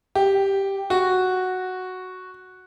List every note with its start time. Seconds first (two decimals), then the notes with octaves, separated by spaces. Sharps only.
0.15 G4
0.90 F#4